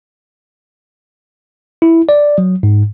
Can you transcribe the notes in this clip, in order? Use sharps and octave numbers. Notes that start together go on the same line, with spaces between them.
E4
D5
F#3
G#2